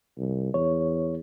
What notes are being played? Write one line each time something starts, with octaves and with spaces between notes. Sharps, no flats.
C2
E2 C#5